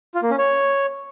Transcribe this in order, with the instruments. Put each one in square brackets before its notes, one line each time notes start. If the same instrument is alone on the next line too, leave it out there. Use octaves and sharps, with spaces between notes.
[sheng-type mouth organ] F4
A#3
C#4
C#5